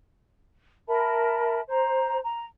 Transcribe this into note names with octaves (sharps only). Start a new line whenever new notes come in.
A#4 E5 A5 B5
C5 A#5
A#5